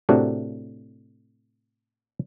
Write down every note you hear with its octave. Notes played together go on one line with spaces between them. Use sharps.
A2 C3 D4 F#4 A#4